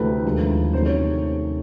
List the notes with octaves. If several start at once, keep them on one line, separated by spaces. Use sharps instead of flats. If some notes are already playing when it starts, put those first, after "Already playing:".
Already playing: D2 C3 E3 A3 C4 B4
D#2 D3 F3 G#3
C3 D#3 F#3 A3 C#4 C5
C#5